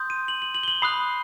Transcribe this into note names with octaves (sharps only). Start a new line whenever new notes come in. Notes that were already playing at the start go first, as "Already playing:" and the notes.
Already playing: C6 D#6 G6
D#7
F#7
F#7
F#7
G7
F#7
B5 D#6 F#6 C7